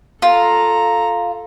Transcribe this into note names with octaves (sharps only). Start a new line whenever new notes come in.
F4 A4 A#5